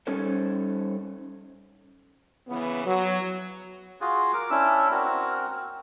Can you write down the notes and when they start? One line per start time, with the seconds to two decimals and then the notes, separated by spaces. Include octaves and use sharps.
0.07 G3 C#4 D#4 A4 C5 C#5
2.48 C#3 E3 B3
2.86 F#3
4.01 F4 F#4 G#4
4.33 A#4 D6
4.50 C#4 D4 E4 E6
4.91 C4 F#4 A#4